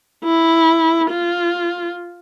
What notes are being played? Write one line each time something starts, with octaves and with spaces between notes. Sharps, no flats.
E4
F4